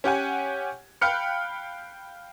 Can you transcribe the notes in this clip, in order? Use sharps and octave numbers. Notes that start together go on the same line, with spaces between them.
C#4 G4 F#5 G#5
F5 G5 B5 F6 F#6 C#7